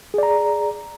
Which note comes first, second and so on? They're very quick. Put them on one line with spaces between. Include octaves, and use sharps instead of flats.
G#4 D5 A#5